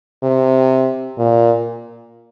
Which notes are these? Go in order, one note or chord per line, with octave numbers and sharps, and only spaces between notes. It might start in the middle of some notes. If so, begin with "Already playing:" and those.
C3
A#2